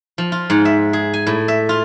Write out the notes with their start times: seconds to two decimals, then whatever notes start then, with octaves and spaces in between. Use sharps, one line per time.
0.18 F3
0.32 F4
0.50 G#2
0.65 E5
0.93 G#4
1.14 G#5
1.27 A2
1.48 E5
1.69 F4